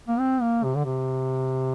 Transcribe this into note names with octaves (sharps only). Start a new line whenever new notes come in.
A#3
C4
A#3
C3
D3
C3